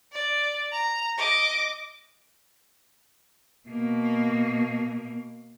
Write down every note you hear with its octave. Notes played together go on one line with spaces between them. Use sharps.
D5
A#5
D#5 D6
B2 A#3